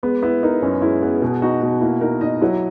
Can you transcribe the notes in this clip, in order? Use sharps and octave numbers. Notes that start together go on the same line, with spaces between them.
G#3 B3
B3 E4
D#4 A#4
F#2 C#4
G#3 E4
B3 G#4
B2 G#4
D#4 F#4
B2 F#4
A#3 E4
D#4 A#4
D#4 D#5
F#3 E4